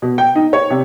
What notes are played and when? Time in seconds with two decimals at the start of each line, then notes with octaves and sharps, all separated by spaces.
0.02 B2
0.18 G5
0.36 D#4
0.53 C#5
0.70 C3